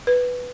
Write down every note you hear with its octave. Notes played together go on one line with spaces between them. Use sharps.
B4